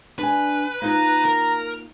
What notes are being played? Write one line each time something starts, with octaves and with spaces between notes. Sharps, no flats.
D4 B4 G#5
A#3 D#4 F4 A#5
A#4